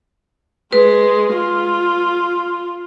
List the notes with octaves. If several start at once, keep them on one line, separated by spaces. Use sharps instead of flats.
G#3 B4
F4